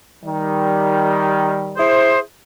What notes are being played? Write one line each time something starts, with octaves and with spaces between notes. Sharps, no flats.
D#3 G3
E4 G#4 C5